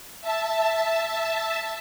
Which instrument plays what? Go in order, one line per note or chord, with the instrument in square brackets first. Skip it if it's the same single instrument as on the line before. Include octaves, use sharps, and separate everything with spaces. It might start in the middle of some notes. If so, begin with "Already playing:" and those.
[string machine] E5 A5